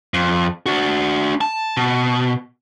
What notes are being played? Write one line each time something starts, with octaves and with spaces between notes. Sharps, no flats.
F2
D4 F#4
A5
B2